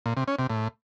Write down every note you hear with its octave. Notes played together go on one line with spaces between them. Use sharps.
A#2
C3
C#4
C3
A2